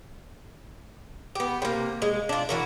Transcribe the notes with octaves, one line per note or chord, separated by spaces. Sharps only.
B3 G4
C3 A#3
G#3
D4 F4
E3 F#4 A#4